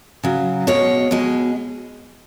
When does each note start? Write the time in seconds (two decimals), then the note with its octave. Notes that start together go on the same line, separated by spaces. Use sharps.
0.23 C#3 F#3
0.67 B2 G#3 C#5
1.11 B2 G#3